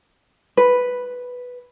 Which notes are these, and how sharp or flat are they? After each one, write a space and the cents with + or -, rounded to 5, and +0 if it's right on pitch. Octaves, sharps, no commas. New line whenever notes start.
B4 +0